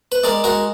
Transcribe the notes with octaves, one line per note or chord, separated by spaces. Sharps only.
B4
G#3 A#4 D5
G#3 F#4 A#4